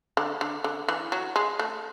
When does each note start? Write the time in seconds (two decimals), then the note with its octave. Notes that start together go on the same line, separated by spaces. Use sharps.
0.17 D3
0.41 D3
0.64 D3
0.88 E3
1.12 F#3
1.36 G#3
1.59 A3